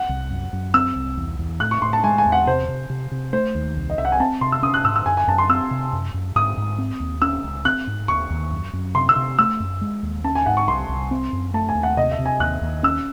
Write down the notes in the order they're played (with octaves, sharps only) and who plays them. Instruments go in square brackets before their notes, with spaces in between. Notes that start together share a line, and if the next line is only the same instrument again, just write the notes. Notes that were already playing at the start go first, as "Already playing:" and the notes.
Already playing: [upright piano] F#5
[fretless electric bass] C2
F#2
F#2
[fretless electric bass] C4 [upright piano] E6
[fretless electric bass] C2
E2
E2
[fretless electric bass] A2 [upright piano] F#6
[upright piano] C#6
[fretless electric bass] A2 [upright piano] C6
[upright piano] A5
[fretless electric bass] G#3 [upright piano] G#5
[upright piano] G#5
[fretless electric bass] E2
[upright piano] F#5
[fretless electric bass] C3 [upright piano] C5
[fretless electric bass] C3
C3
C3
[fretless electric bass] A3 [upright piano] C5
[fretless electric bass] D#2
C2
[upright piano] D#5
[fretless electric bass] C2 [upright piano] E5
[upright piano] F#5
G#5
[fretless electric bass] C4 [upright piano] A5
[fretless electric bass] C3 [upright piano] C6
[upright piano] E6
[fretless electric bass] C#4 [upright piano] D#6
[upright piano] F#6
[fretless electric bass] G#2 [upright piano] E6
[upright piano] E6
[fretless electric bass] F#2 [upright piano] G#5
[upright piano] G#5
[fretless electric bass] F#2 [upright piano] A5
[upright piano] C6
[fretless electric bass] C4 [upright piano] E6
[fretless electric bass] C3
F#2
F#2
[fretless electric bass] G#2 [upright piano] D#6
[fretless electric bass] G#2
C4
D#2
[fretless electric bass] C#4 [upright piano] E6
[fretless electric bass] C#2
[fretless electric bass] C4 [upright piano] F#6
[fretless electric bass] G#2
[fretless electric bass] D#2 [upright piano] C#6
[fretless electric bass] D#2
F#2
F#2
[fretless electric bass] C3 [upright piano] C6
[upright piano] E6
[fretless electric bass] C3
[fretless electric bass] A3 [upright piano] E6
[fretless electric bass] F#2
G#3
D#2
[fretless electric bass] C#4 [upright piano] A5
[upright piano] G#5
[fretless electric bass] G#2 [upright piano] F#5
[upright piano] C#6
[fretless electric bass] C2 [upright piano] C6
[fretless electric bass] C2
C4
F#2
[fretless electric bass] A3 [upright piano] A5
[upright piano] G#5
[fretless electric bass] D#2
[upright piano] F#5
[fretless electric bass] C3 [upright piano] D#5
[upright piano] E5
[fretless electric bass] C3
[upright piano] G#5
[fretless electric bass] D#2 [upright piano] F#6
[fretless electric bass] D#2
[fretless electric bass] C#4 [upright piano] E6